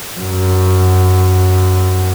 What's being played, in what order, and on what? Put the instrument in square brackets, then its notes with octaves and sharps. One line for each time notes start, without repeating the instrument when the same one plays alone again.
[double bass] F#2